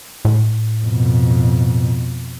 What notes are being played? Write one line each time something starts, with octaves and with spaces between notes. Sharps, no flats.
A2
F2 B2